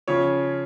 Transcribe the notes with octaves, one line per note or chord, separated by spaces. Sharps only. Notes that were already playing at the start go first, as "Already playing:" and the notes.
C#3 F3 C#5